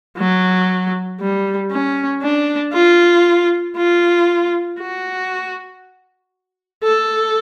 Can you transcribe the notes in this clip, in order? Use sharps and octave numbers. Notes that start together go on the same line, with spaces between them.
F#3
G3
C#4
D4
F4
F4
F#4
A4